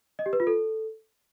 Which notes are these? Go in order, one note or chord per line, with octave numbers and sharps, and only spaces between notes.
D#5
G4
B4
F4
A4